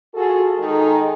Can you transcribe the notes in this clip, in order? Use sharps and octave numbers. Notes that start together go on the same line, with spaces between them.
F4 F#4 G#4 A4
D#3 G#3 D#4 G#4 A4 D#5